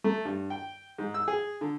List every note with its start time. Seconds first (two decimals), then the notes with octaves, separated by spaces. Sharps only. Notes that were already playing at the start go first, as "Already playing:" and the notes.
0.04 A3
0.25 G2
0.50 G5
0.98 G#2
1.14 E6
1.28 G#4
1.61 D3